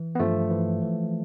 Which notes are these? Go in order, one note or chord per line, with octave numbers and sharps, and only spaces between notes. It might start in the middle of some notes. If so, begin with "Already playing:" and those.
Already playing: E3
B3
G2 F3 A3
E3
E3